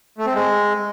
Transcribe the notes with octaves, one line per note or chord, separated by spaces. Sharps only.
A3
C4
G#3